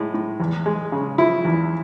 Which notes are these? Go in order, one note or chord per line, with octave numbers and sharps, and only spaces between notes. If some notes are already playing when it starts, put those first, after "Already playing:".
Already playing: A2 G#3
A2
E2
G#3
C#3
F3 E4
E2